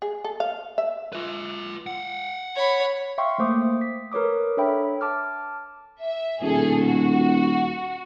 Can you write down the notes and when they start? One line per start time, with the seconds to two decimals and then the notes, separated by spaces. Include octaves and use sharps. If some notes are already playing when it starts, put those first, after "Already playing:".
0.02 G#4
0.24 A4
0.40 F5
0.78 E5
1.13 F4 B4
1.87 F5 F#5
2.56 C#5 B5
3.18 E5 F5 G5 C6 C#6
3.38 A3 A#3 C5 D6 D#6
3.81 B6
4.12 A#4 B4 C#5 D6 D#6
4.57 D4 A4 C#5 E5 G5 B5
5.01 A5 D6 F6
6.01 E5
6.42 D#1 B2 G#4 A4
6.88 F#4